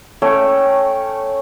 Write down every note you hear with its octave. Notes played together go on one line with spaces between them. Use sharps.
A3 C#4 C#5 G5